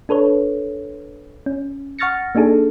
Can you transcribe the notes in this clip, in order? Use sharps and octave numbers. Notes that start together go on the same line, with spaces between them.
D4 A4 B4 C#5
C#4
F#5 C#6 F6 A6 A#6 C#7
A#3 D4 D#4 G#4 A4